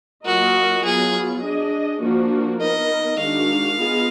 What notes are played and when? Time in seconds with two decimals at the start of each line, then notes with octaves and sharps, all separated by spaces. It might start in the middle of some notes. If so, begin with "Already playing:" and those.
0.25 F#3 A#3 F4 F#4 A#4 D#5
0.84 F#3 B3 F4 G#4
1.43 D4 G#4 D#5
2.01 F3 A#3 D4 F#4
2.61 B3 D#4 A#4 D#5
3.19 D#3 G#3 D4 F#4 F5
3.78 B3 F4 G#4 D#5